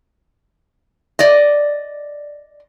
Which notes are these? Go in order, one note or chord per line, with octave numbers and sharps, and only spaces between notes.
D5 D#5